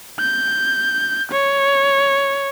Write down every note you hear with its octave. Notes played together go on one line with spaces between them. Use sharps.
G6
C#5